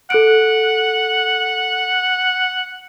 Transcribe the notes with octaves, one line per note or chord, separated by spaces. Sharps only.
A4 F#5 F#6 D7